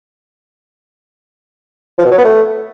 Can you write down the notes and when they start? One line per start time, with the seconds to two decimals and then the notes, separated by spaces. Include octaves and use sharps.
1.98 F3
2.05 B2
2.11 F#3
2.18 B3
2.25 A3